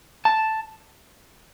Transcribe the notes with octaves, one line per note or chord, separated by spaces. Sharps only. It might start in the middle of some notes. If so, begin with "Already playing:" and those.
A5